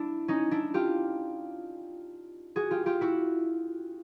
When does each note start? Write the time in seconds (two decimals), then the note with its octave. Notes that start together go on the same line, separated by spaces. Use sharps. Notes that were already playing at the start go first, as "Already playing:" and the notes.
Already playing: D4 E4
0.28 C#4 D#4
0.51 D4 E4
0.74 F4 G4
2.56 F#4 G#4
2.71 F4 G4
2.86 F4 G4
3.01 E4 F#4